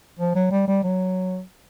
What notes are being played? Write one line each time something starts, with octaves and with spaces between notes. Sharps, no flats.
F3
F#3
G3
G3
F#3